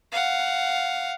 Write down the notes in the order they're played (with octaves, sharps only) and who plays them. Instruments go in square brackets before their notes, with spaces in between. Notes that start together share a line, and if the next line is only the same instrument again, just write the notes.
[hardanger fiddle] F5 F#5